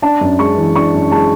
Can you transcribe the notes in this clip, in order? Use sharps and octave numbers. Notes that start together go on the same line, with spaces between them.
D4 A5
F#2
G#3 C#6
E3
D4 C#6
F#2
G#3 A5